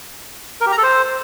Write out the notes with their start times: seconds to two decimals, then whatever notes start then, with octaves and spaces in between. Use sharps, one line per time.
0.61 A#4
0.66 G4
0.72 A#5
0.77 A4
0.83 C5